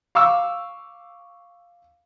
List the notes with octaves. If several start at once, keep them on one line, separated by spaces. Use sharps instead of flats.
F5 C#6 D6 E6